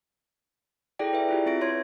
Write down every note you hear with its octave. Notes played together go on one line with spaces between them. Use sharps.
E4 G#4 A4 D5 G5
B4 E5
E4 F4 G4
C4 E5 A#6 D7
B4 C#5 C6 G#6